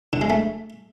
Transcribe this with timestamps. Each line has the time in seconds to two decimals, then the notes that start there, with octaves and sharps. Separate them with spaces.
0.13 D3
0.21 G#3
0.30 A3